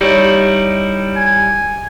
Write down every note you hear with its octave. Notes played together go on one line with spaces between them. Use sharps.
G3 D#4 E4 G4 C#5 D5
G#5